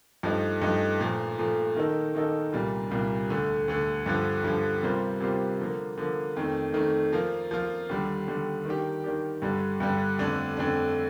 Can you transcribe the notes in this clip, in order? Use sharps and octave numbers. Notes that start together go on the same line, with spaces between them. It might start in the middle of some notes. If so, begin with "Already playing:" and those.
G2 F3 A3 D#4
G2 F3 A3 D#4
A#2 F3 A3
A#2 F3 A3
D#3 A#3 D#4 A4
D#3 A#3 D#4 A4
C2 A#2 G3 A#3 F4
C2 A#2 G3 A#3 F4
D2 D3 A3
D2 D3 A3
G2 D3 F3
G2 D3 F3
C3 G3 A#3 F4 C5
C3 G3 A#3 F4 C5
D3 F3 A#3
D3 F3 A#3
F2 D#3 A3
F2 D#3 A3
F3 A#3 F4
F3 A#3 F4
D#2 D3 G3
D#2 D3 G3
D#3 A#3 D4 G4
D#3 A#3 D4 G4
G2 D3 G3
G2 D3 G3
F2 D3 A3 D4
F2 D3 A3 D4